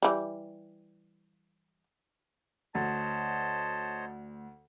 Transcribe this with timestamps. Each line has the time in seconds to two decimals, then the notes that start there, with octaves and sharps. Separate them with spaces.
0.02 E3 G3
2.75 D2 C5 C#5 D#5 A5